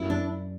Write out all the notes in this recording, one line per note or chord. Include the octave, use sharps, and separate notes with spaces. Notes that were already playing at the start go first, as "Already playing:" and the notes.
Already playing: F#2 E4
D4